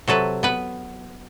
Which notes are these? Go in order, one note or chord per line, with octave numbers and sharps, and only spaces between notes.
C3 F#3 A4 B4
B3 B4